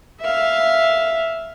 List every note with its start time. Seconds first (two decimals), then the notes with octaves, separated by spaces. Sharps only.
0.20 E5 F5